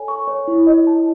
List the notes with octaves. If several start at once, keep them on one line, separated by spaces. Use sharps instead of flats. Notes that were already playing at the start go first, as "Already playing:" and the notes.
Already playing: A4 C#5 G#5
C#6
C#5
E4
D#5
A5